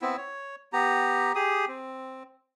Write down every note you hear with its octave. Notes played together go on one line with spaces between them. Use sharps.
B3 C4 E4
C#5
B3 G4 A#5
G4 G#4 D#6
C4